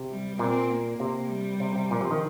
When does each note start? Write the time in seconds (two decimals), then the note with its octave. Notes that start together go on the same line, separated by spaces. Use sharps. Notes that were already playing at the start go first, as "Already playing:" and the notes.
Already playing: C3
0.09 G3
0.39 A#2 C4
0.70 A#3
1.00 C3
1.30 G3
1.60 C3
1.76 C3
1.91 A#2 F3
2.01 C3
2.11 D#3